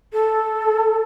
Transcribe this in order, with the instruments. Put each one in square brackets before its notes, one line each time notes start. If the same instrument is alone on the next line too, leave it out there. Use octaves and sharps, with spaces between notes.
[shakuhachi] A4